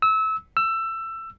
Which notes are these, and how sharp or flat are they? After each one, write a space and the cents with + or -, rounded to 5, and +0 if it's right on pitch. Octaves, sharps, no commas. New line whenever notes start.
E6 -25
E6 +20